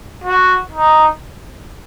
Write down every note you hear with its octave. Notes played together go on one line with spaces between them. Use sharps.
F#4
D#4